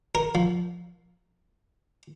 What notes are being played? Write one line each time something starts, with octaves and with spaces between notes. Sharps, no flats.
A#4
F3